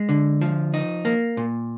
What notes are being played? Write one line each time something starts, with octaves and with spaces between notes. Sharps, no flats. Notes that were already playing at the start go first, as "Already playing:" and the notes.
Already playing: G#3
D3
F3
D#4
A#3
A#2